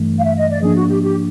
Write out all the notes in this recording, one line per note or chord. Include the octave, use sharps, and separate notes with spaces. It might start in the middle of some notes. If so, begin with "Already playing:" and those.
Already playing: G2 E3 A3
F5
E5
D#5
D5
G#2 F3 A#3 D4 G#4
F#4
G4
G4